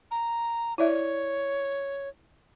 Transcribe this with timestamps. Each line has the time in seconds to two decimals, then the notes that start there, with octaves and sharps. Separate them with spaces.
0.11 A#5
0.78 E4 C#5 D5 E5